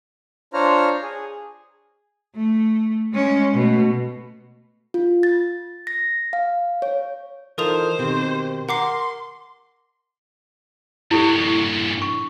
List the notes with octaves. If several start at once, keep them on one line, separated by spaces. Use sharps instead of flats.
D4 F4 C5 C#5 A#5 F6
G#4
A3
G#3 C#4
B2 A3
F4
A6
A#6
F5
C#5
E3 D#4 F4 A4 A#4 C5 D#6 F7
B2 D#3 C4 G4
A#4 F#5 C6 D6 C7
G2 A#2 E4 G4 A4
C#6
D4 C#6